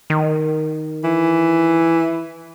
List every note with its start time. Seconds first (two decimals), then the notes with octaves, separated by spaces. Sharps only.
0.10 D#3
1.04 E3